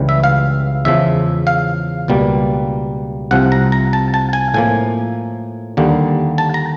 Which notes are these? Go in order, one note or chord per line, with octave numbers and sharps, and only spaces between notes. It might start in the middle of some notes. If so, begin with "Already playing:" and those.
Already playing: C#2 C#3 E3 G3
E5
F5
E2 C#3 F3 G#3 E5
F5
C#2 B2 G3 A#3
C2 C3 F3 F#5
A#5
A#5
A5
A5
G#5
A2 F3 A#3 G#5
D#2 D3 G3 A#3
A5
A#5